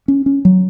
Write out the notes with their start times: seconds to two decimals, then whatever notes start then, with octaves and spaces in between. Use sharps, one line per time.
0.08 C#4
0.26 C#4
0.45 F#3